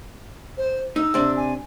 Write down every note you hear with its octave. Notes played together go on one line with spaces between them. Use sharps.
C5
D#4 E6
C3 D4
G#5